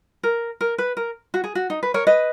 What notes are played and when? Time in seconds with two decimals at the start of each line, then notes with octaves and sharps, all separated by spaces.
0.23 A#4
0.61 A#4
0.78 B4
0.97 A#4
1.34 F#4
1.44 G#4
1.55 F#4
1.70 D#4
1.83 B4
1.94 A#4 C#5
2.07 B4 D#5